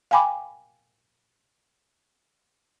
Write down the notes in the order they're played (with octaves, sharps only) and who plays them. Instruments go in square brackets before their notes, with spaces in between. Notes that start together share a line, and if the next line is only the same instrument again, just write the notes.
[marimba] F5 G5 G#5 B5 D6